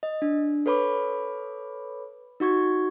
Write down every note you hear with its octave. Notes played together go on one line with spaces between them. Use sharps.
D#5
D4
A4 B4 C#5 B5 D6
D#4 F#4 C#6 G#6